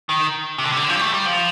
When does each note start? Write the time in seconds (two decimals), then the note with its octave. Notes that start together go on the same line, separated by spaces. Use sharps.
0.09 D#3
0.58 C3
0.64 D3
0.72 C3
0.77 D3
0.89 F3
0.96 G3
1.01 A3
1.14 G3
1.26 F3